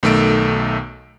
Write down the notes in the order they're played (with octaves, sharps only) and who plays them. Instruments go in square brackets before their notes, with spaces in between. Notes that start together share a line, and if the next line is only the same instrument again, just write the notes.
[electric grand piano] B1 D#3 A3 A4 D7